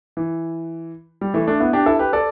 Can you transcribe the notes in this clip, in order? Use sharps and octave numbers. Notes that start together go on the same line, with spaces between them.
E3
G3
E3 A3
A3 D4
B3 E4
D4 G4
E4 A4
G4 B4
A4 D5